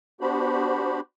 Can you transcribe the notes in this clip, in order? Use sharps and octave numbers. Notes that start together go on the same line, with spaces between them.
B3 D4 F#4 G4 C5 B5